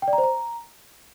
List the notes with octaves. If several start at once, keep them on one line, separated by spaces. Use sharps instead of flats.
G5
D5
A#5
C5
A#5